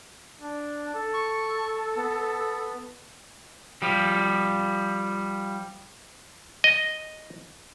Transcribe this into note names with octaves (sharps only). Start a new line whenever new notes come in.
D4
A4
C#6
B3
F3 G3
D#5